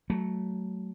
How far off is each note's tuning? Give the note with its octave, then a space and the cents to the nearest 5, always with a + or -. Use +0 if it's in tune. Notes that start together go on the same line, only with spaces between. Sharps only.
F#3 +15 A3 -10